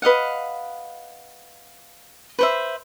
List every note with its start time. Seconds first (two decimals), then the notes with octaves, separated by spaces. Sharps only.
0.02 B4 D#5 F5 F#5
2.39 B4 C5 E5